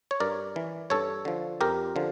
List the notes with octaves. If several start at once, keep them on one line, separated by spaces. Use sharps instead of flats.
C#5
G2 A#4 D5
E3
G2 A4 C#5
D3 F3
F2 G4 A#4
D3 F3